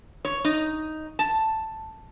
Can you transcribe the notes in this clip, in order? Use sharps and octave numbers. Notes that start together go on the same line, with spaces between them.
C#5
D#4
A5